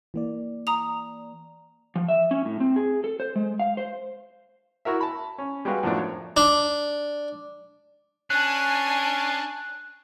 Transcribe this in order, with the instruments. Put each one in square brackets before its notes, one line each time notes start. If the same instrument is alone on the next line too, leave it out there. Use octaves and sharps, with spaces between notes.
[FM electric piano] E3 A#3 D5
[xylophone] A#5 D#6 F7
[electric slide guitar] F3
E5
C#4
A2
C4
G#4
A4
C5
G#3
F5
C5
[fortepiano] E4 F#4 A#4 E5
A5 B5
C#4
G3 G#3 F#4 B4 F5
F#2 A2 F3 F#3 D4
C#5
[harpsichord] D4
[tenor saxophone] C#4 [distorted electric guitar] D4 [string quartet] G#5 A5 [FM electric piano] F#6